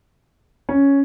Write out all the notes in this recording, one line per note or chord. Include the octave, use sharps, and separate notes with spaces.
C#4